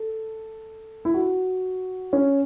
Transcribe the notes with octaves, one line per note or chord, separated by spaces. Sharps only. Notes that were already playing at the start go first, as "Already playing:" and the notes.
Already playing: A4
E4
F#4
C#4